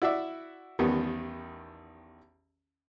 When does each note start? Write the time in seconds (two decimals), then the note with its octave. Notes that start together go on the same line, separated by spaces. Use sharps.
0.02 E4 F#4 D5 E5
0.79 A1 E2 D#3 G3 B3